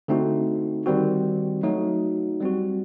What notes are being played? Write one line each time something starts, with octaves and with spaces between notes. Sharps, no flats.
D3 A3 C4 D#4 F#4
D#3 G3 C4 F#4
F#3 A3 D#4 F#4
G3 C4 F#4